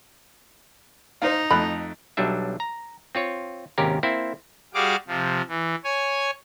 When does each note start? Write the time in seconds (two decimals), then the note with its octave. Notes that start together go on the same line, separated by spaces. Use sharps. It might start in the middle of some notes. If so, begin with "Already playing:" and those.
1.22 D#4 C5 F5
1.51 F2 A3 B5 F#6
2.17 B1 F#3 G3 D4 E5
2.60 A#5
3.15 C4 F4 C#5
3.78 G#1 D#2 C3 C#4 G4 A#4
4.03 A#3 C4 E4 C5
4.74 G3 F#4 G#4 F5 D6
5.07 C3 F3
5.48 E3
5.84 C#5 G#5